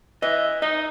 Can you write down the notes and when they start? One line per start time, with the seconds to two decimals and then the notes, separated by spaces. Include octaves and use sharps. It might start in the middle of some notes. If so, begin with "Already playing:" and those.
0.22 E3 D#5
0.62 D#4 D#5